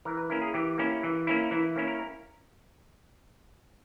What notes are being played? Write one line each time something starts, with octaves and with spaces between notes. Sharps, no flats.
E3 A#4
B4
A#3 C#4 E4 A#4
G#4
E3 G4
A#3 C#4 E4
E3
A#3 C#4 E4
E3 E4
A#3 C#4 E4 C#5
A#4